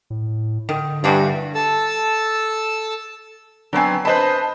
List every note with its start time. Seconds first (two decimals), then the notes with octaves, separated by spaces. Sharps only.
0.10 A2
0.69 D3 D#3
1.04 G2 E3 D4 F#4
1.55 A4 A5 E6
3.73 F#3 B3 C4 D4 G#5
4.05 B4 C5 D#5 A5 B5